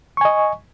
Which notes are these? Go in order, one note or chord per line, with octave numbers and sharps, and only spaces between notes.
D#5 G#5 C#6